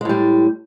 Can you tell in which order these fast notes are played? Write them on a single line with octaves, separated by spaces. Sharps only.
G#3 A2 G3